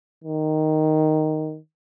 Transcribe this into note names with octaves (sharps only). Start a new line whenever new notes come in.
D#3